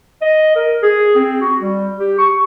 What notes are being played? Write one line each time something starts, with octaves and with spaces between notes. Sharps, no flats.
D#5
A#4
G#4
C4
F#4
G3
G4
C#6